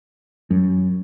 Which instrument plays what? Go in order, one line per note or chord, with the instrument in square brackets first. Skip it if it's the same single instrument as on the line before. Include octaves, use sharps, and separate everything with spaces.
[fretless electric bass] F#2